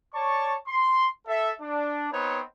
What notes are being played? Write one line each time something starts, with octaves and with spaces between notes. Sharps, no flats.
C#5 D5 A5 C#6
C6
A4 E5
D4
B3 C4 D#4 B4 C#5